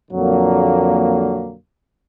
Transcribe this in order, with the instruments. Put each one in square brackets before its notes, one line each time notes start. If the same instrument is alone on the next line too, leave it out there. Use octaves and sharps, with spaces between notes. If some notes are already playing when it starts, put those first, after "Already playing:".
[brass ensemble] F2 A#2 D3 F#3 A#3